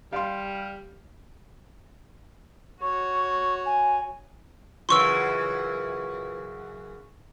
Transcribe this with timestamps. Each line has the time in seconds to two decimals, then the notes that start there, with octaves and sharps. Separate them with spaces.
0.13 G3 F5 C6
2.81 F#4 C#5 C#6
3.66 G#5
4.89 F#2 C#3 E3 F4 B4 C6 C#6 E6